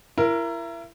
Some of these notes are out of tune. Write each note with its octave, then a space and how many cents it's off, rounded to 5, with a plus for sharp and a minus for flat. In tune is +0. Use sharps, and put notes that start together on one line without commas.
E4 +30 A#4 +0